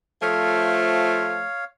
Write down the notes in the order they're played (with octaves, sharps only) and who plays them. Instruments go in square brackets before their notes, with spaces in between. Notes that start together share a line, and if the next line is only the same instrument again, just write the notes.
[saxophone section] F3 A3 [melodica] C#5 F5